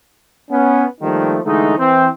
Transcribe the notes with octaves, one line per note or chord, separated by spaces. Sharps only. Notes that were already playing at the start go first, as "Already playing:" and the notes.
B3 C#4
D#3 F3 G3 A3 A#3 D#4
D3 E3 G#3 A3 D#4
E3 C4